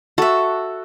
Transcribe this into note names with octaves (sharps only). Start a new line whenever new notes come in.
F#4 A4 E5